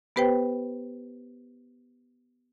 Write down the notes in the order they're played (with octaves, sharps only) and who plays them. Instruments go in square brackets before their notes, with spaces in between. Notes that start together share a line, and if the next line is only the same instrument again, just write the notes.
[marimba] B3 G4 B4 C5 G5